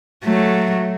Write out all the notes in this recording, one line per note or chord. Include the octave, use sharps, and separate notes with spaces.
F#3 A3